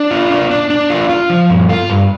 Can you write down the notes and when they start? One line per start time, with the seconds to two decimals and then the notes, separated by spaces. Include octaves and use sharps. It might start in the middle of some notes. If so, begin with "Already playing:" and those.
Already playing: D4
0.11 F4
0.31 D4
0.51 D4
0.70 D4
0.90 F4
1.09 F4
1.30 F3
1.50 G2
1.69 F4
1.90 G2